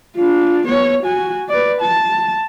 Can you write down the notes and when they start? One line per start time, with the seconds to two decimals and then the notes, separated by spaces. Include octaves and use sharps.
0.16 D4 F4
0.66 B3 C#5
1.03 F#4 G#5
1.49 B4 D5
1.81 A5